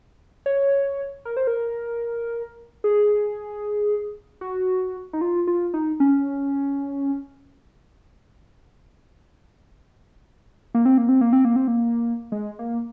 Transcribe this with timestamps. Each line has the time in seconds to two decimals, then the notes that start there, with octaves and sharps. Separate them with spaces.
0.46 C#5
1.25 A#4
1.37 C5
1.47 A#4
2.84 G#4
4.41 F#4
5.13 D#4
5.21 F4
5.47 F4
5.74 D#4
6.00 C#4
10.74 A#3
10.86 C4
10.98 A#3
11.09 C4
11.21 A#3
11.33 C4
11.45 A#3
11.56 C4
11.68 A#3
12.32 G#3
12.59 A#3